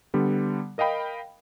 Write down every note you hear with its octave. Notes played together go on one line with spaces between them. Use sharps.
D3 G3 B3
A#4 D#5 F5 G5 B5